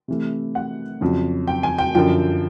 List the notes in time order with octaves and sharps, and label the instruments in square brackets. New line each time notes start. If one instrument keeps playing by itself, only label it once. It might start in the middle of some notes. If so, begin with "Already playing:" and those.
[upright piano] C3 E3 A3
F#5
F2 C#3 F#3
G5
G#5
G5
F#2 D3 F3 G5